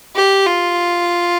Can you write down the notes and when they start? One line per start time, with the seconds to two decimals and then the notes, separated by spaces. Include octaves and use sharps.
0.15 G4
0.46 F4